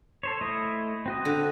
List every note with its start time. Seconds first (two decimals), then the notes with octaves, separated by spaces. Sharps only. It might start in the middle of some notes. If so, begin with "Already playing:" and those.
0.23 A4 C5 C#5
0.41 A3 E4 D#5
1.06 C4 F#4 D#5
1.25 D3